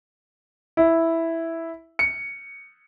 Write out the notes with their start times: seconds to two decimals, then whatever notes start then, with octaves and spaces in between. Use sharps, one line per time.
0.77 E4
1.99 C#7